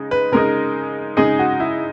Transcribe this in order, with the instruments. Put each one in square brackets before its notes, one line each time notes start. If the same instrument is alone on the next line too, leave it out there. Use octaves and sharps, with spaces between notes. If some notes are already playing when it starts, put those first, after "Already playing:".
Already playing: [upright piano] C#3 G#3 D#4
[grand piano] B4
[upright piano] C#3 G#3 D#4 [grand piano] A#4
[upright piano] C#3 G#3 D#4 [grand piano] G#4
[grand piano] F#4
E4